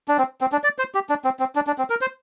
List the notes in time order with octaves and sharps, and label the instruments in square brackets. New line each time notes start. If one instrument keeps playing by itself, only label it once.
[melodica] D4
C4
C4
D4
D5
C5
G4
D4
C4
C4
D4
D4
C4
A#4
C5